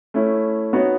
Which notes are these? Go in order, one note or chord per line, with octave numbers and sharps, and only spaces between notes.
A3 C#4 E4
B3 D#4 F#4 C#5